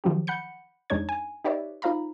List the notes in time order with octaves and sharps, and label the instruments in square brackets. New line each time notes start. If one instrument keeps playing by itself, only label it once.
[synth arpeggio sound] D#3 F3 F#3 C#4 G4
F#5 B5 G6 C#7
F2 G#3 D4 D#4 C#5 G#6
G#5
D#4 G4 B4 C#5 D5 E5
D#4 F4 C5 F5 A#5 B5